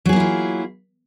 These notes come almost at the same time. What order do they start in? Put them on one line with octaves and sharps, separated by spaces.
F#3 G#4 A#3 E4 F4